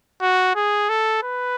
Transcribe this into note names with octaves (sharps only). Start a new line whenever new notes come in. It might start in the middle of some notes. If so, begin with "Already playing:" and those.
F#4
G#4
A4
B4